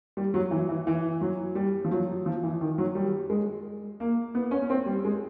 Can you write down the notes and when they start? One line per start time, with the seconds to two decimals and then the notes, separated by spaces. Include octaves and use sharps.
0.17 G3
0.34 F#3
0.51 E3
0.69 E3
0.87 E3
1.21 F#3
1.55 G3
1.85 F3
1.91 F#3
2.26 F3
2.43 E3
2.61 D#3
2.78 F#3
2.95 G3
3.30 G#3
4.00 A#3
4.35 B3
4.51 C#4
4.70 C4
4.86 G3
5.05 G#3